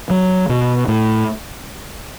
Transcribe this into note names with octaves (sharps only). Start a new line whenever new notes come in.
F#3
B2
A2